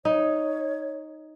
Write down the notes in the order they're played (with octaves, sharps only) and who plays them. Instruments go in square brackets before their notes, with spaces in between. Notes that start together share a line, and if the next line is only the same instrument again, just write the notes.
[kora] D#4 [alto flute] C#5